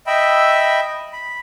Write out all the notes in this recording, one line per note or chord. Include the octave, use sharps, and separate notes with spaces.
D#5 E5 G5 B5 E6
B5